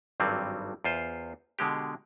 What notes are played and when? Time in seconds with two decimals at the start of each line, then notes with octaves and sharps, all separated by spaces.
0.20 G#1 G2 F#3 G3 C4
0.84 E2 F4 C5
1.59 B2 D3 G#3 G4